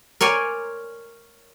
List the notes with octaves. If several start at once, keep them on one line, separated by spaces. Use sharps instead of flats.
A#4 C#5 D5 G#5 C6